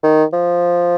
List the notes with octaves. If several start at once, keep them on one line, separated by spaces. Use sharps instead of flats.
D#3
F3